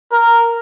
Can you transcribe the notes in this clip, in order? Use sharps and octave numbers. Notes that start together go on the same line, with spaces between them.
A#4